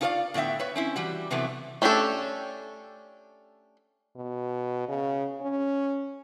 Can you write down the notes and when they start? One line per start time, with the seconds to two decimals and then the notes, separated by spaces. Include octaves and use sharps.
0.01 D#4 F4 G#4 C#5 D5 F5
0.34 A2 D3 B3 E5 G5
0.59 B4 C#5
0.76 C4 C#4 E4
0.96 E3 G3 F#4
1.30 A2 C3 E3 F#3 A3 B3
1.82 A3 C#4 D4 G4 A4
4.17 B2
4.88 C#3
5.42 C#4